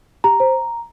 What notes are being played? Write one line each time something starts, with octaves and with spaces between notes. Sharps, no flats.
G4 A#5
C5